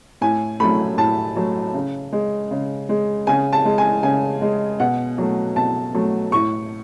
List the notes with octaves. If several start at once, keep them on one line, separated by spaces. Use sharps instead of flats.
A2 G#5
F#3 A3 B5
A2 A5
F#3 A3
C#3
G#3
C#3
G#3
C#3 G#5
A5
G#3
G#5
C#3 G#5
G#3
B2 F#5
F#3 A3
B2 A5
F#3 A3
A2 C#6